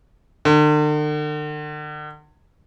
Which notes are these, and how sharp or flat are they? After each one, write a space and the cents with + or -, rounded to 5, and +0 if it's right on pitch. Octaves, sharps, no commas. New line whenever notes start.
D3 +45